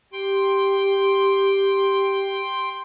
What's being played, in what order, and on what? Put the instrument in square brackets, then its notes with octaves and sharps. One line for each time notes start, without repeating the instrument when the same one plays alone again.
[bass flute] G4 [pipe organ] G5 C6